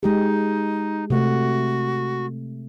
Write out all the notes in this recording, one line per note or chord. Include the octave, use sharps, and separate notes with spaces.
G#3 D#4 G4 G#4
C3 A3 F#4